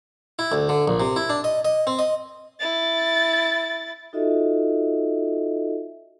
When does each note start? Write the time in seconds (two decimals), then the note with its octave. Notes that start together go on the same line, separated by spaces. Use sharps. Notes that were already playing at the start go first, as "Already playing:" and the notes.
0.39 E4
0.52 D2
0.69 D3
0.88 A#1
1.00 C3
1.16 E4
1.30 D4
1.44 D#5
1.65 D#5
1.87 C4
1.99 D#5
2.60 E4 A6
4.13 D#4 F4 F#4 A4 D#5 E5